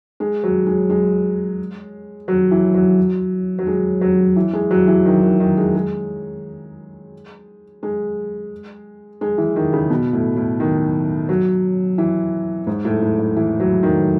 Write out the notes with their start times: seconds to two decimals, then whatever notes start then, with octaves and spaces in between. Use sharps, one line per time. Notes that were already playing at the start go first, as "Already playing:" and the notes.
0.20 G#3
0.44 F#3
0.66 G#3
0.90 G#3
2.28 F#3
2.51 E3
2.75 F#3
3.59 F#3
3.67 G#3
4.01 F#3
4.36 E3
4.53 G#3
4.71 F#3
4.88 E3
5.05 D#3
5.23 D#3
5.40 D#3
5.57 G#3
5.75 G#3
7.83 G#3
9.21 G#3
9.38 E3
9.56 D#3
9.73 C#3
9.90 B2
10.13 A2
10.36 A2
10.60 D#3
11.29 F#3
11.98 E3
12.67 G#2
12.85 A2
13.02 A2
13.19 A2
13.36 E3
13.60 F#3
13.83 D#3